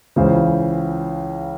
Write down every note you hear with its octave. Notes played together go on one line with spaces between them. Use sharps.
C#2 C#3 E3 C5